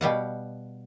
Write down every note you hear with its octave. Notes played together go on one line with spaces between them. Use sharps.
B2 G3 F5 F#5